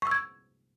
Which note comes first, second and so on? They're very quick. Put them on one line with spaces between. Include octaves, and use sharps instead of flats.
C#6 E6 G#6